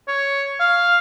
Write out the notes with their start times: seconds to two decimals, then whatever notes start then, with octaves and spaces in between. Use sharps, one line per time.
0.08 C#5
0.60 F5